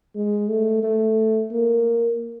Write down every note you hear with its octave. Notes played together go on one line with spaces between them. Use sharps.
G#3
A3
A3
A#3